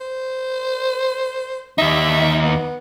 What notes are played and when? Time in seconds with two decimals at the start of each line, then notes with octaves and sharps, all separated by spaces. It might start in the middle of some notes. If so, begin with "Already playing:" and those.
0.01 C5
1.78 D#2 D#4 E5
2.45 B3